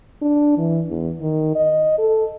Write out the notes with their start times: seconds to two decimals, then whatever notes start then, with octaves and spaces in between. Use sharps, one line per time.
0.22 D4
0.57 E3
0.89 E2
1.21 D#3
1.56 D#5
1.98 A4